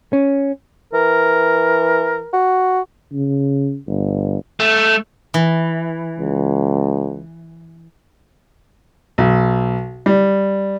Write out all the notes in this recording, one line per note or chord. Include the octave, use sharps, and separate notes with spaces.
C#4
E3 A#4
F#4
C#3
G1
A3
E3
C#2
B1
G3